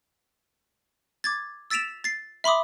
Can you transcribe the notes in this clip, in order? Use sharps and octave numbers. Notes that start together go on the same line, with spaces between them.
D6 G#6 A6
E6 A6 B6 D7 E7 F7
A6 C7
E5 B5 C6 D6 D#6